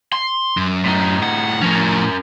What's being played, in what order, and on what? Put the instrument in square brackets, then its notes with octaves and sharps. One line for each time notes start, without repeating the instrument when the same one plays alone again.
[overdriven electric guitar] C6
[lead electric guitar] F#2
[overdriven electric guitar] A2 D#4
[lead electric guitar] F#5
[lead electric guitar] A2 F3 [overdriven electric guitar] C#4 A#4